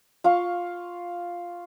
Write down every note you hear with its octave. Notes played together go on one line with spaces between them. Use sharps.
F4 F5 C#6